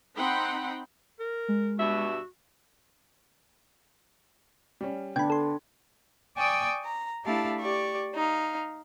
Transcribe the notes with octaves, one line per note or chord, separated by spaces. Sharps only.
C4 D#4 F#5 G5 B5 C6
A#4
G#3
G2 B2 F#4 E5
G3 C#4
D3 B3 D4 G5 B5 G#6
A4 C6
D5 G5 G#5 C#6 D#6 E6
A#5
A3 D4 E4 G4 F5 A5
G4 D5 C#6
D#4 F5